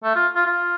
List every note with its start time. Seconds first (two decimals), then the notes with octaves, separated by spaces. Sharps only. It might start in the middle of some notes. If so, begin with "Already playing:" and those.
0.04 A3
0.16 F4
0.36 F4
0.46 F4